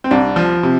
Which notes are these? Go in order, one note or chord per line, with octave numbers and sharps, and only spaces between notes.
C4
C2 D4
F3
C3